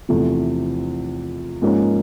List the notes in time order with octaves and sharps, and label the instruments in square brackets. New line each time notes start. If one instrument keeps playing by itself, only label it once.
[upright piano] E2 C3 F3 A3
G#2 F3 A#3 C#4